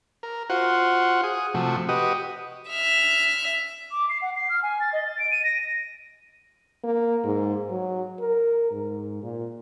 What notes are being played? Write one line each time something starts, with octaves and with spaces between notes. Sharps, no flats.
A#4
F4 F#4 C5 F#5
G#4 D#6
C3 F3 A3 F#4
F#4 G4 B4 D#5 D#6
E5 F6
D6
C7
F#5
C7
F6
G#5
A6
D#5
A6
D7
D#7
A#6
A#3
G#2
F#3
A#4
G#2
A#2